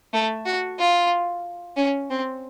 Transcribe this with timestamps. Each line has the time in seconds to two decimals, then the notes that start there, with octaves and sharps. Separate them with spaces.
0.13 A3
0.45 F#4
0.79 F4
1.77 C#4
2.10 C4